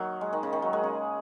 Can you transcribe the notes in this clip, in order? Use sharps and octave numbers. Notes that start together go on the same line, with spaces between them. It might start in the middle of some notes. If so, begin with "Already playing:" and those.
Already playing: D#3 F#3 A#3
G#3
D#3
C#3
D#3
F#3
G#3
C#3